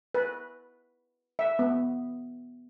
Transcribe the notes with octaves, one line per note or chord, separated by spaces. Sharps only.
B4
E5
B3